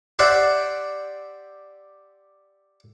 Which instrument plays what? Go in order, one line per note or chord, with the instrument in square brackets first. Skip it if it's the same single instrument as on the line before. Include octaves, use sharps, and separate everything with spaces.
[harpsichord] G4 C5 D5 E5 F#5